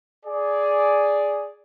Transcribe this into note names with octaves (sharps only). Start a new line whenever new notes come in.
G#4 D5